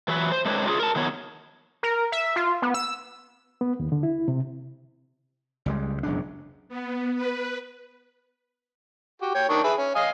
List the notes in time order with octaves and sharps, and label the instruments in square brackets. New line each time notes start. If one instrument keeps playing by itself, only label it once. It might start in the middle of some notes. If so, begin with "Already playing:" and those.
[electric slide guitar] E3 F#3 B4
C5
G#3 A3 C4 D4 B4 C#5
F4 F#4 G#4
A#4 A5
D#3 F#3 B3 C#5
[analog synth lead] A#4
E5
F4
B3
E6
[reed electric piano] B3
D#2
D3
E4
C3
[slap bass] C#2 G3 G#3
E1 F#2 C#3 D4
[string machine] B3
B4
[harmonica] F#4 G4
C#5 G5
D#3 D4 C#6
G#4 B4 E5
C#4
D#5 F5 G#5